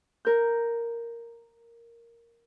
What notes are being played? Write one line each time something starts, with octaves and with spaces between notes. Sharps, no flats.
A#4 G6